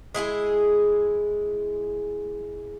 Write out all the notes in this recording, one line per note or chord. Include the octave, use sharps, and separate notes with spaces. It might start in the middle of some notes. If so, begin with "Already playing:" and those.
G#3 E4 F4 G#4